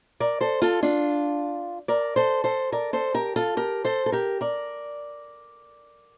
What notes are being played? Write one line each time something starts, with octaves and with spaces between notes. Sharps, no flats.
A#4 D5
A4 C5
F4 A4
D4 F4
A#4 D5
A4 C5
A4 C5
A#4 D5
A4 C5
G4 A#4
F4 A4
G4 A#4
A4 C5
A4
G4 A#4
A#4 D5